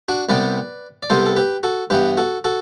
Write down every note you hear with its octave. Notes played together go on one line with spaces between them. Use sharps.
D4 F#4
C2 C3 G3 B3 B4 D5
D5
C2 C3 G3 B3 A4 C5
A4
G4 B4
F#4 A4
G2 E3 B3 G4 B4
F#4 A4
F#4 A4